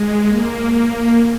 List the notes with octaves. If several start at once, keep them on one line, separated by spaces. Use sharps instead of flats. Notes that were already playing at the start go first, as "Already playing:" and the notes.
Already playing: G#3
A#3
A#3